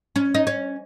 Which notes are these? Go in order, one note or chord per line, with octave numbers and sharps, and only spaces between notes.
C#4
D#4
C#4